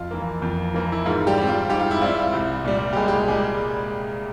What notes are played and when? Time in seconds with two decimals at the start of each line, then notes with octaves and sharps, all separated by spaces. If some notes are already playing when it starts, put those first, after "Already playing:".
Already playing: F2 F4
0.11 E3 A#3
0.42 F2
0.74 E3 A#3
0.92 E4
1.05 G#2 F4
1.27 G3 G4
1.38 G3 C4
1.48 F4
1.69 G#2 G4
1.80 F4
1.91 E4
2.01 G3 C4 F4
2.33 C2
2.65 A#2 G3
2.93 G4
2.96 C2 G#3 G#4
3.08 G4
3.12 G#3 G#4
3.28 A#2 G3 G#3 G#4